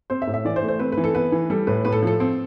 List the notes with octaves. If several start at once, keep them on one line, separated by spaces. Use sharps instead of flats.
C4 C5
E5
A2
E5
E3 D5
C5
A3
C5
C4 B4
B4
E3
A4
B3 B4
E3
G3 A4
A2 B4
A2 B4
A4
F3 A4
C4